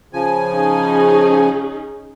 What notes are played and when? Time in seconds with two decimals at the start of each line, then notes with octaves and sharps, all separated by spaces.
0.13 C#3 F3 G#5
0.52 C#4 D#4 G#4